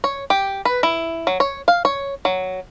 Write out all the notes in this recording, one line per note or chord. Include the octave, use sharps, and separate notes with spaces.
C#5
G4
B4
E4
F#3
C#5
F5
C#5
F#3